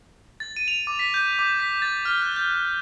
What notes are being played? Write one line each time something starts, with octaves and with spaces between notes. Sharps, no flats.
A6
D#7
F7
D6
B6
G6
D6
B6
A6
F6
F#6
G6